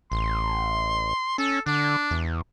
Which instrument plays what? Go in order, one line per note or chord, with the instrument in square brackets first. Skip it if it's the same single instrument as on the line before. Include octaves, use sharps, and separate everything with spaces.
[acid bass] A1 [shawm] C6
[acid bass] C#4 [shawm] A4
[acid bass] D3 [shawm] D4
[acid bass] E2